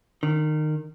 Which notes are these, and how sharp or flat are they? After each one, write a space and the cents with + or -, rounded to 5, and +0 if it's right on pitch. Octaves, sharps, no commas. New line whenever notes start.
D#3 -25